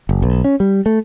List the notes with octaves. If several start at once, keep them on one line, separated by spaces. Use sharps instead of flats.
F#1
B1
C#4
G3
A3